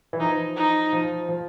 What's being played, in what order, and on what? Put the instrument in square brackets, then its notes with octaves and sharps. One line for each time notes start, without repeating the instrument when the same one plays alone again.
[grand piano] E3
[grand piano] F3 [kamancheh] D#4
[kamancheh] D#4
[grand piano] F3
F3